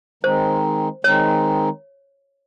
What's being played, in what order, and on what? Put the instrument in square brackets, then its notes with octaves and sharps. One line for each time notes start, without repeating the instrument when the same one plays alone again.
[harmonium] D#3 G#3 C4 D#4 [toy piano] C5
[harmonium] D#3 G#3 C4 D#4 [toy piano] C#5